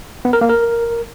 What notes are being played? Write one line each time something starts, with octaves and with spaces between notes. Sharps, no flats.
B3
A#4
A#3
A#4